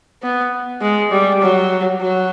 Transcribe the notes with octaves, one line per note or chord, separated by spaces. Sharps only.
B3
G#3
G3
F#3
F#3